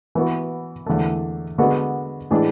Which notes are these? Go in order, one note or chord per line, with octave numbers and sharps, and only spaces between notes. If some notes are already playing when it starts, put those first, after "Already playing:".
E3 B3 F#4
E2 D3 A3
D3 G#3 B3 F#4
A2 E3 G#3 D4 G#4